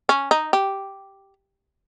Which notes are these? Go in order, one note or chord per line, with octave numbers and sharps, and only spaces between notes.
C#4
D#4
G4